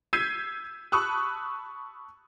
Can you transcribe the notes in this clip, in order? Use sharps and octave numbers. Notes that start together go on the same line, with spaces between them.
E6 G6 G#6 B6 C7 D#7
A5 B5 C#6 D#6 E6 F#6